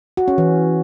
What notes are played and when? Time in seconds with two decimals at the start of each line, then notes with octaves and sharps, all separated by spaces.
0.17 F#4
0.28 C#4
0.38 E3